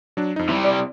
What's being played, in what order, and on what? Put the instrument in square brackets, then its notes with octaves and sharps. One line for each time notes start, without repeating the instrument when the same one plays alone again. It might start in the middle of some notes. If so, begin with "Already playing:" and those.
[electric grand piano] F#3 D4
F2 D#4
[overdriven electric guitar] C3 G3 [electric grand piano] E4
[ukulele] D5